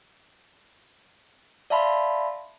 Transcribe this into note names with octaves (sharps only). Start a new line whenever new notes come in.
D5 E5 F5 A5 B5 C6